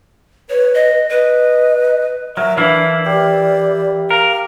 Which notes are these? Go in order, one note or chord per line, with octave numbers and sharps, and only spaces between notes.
B4 C#5
D#5
B4 D#5
F#3 A#4 E5
E3 D4 E4 F5
G4 D5
A#4 F5